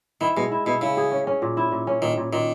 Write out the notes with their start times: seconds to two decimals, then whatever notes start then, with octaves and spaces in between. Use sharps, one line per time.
0.21 D#3 E4
0.37 B2 G#3
0.51 E4
0.66 B2 E4
0.81 C#3 E4
0.97 G#4
1.12 C#4
1.27 C#4
1.42 A#2
1.57 E4
1.72 A#2
1.87 C#4
2.02 A#2 D#3
2.17 A#2
2.33 A#2 D#3